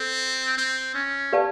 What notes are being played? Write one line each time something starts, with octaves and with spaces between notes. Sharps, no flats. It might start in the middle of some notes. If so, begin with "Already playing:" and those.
Already playing: C4 A4 C5
C4
C#4
G4 B4 D5 F5 A5